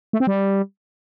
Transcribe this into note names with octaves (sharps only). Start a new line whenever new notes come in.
A3
C4
G3